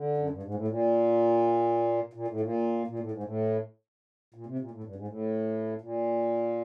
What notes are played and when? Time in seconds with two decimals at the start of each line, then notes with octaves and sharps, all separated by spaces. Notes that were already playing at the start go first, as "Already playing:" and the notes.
Already playing: D3
0.17 F#2
0.30 G2
0.43 G#2
0.54 A2
0.68 A#2
2.13 A#2
2.28 A2
2.41 A#2
2.88 A#2
2.99 A2
3.11 G#2
3.23 A2
4.34 A#2
4.46 C3
4.59 A#2
4.71 A2
4.84 G2
4.96 G#2
5.08 A2
5.81 A#2